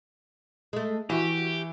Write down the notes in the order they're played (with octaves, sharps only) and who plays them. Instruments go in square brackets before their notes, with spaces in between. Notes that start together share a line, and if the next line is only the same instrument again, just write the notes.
[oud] G#3 A3
[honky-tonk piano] E3 [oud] F#4 [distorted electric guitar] G4